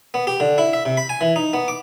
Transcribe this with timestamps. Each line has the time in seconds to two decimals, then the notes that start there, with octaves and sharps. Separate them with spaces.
0.14 B3
0.27 G4
0.40 D3
0.58 E4
0.73 E5
0.86 C3
0.97 B5
1.09 G#5
1.21 E3
1.36 D#4
1.53 B3
1.68 D6